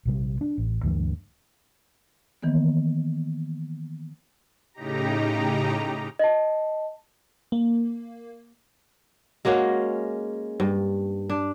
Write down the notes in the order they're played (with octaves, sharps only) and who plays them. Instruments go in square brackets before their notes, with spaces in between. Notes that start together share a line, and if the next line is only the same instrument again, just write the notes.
[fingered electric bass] A#1 C3 G3
D4
A1
D2 G2 E3
[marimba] D#3 E3 A#3 B3
[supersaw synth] A2 C#3 D#4 G4 A#5
[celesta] D#5 A5
[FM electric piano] A#3
[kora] G#3 A#3 C#4 F#4
G2
D4